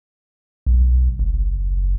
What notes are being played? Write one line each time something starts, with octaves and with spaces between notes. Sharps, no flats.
B1
F#1